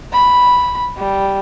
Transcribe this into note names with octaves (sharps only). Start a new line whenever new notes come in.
B5
G3